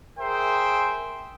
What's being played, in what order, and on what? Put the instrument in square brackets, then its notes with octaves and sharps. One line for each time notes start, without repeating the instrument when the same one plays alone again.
[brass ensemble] G#4 A#4 C5 E5 G5